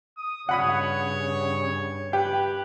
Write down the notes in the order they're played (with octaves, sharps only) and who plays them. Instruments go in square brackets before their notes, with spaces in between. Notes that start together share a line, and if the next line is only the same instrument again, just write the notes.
[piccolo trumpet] D#6
[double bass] G2 C#3 [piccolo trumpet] C#5 [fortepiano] F#5 B5 D#6
[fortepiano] G4 [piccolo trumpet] B4